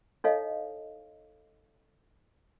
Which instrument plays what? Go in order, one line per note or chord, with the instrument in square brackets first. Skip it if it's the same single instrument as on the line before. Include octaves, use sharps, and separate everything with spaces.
[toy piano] D#4 E4 A4 C#5 D#5 F5